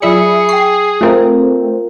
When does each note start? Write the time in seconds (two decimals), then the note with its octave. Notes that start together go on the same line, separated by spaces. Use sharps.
0.02 F#3 F4 G#4 D5 E5 B5 C#7
0.49 G5 C#6 C7
1.01 A3 C4 F4 A#4